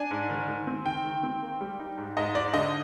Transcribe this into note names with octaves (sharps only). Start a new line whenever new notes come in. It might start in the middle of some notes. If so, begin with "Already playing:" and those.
Already playing: D4 G#5
G#2
D#3
D#3
C4
D#3 G5
D#3
C4
A#3
G3
D#4
G#2
G#2 D#5
D#4 D5
D3 D#5